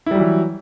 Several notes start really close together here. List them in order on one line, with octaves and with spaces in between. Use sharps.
E4 G3 F#3 E3